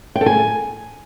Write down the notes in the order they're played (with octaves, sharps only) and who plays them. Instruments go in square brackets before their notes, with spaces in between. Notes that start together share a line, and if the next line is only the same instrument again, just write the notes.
[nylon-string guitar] G5
A4
G#5